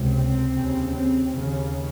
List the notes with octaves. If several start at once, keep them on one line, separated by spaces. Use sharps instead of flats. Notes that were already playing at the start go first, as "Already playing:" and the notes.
Already playing: C#2 C3
C4
D#2 C#3
C4
D#2 C#3